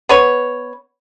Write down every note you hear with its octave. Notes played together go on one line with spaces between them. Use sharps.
B3 B4 C#5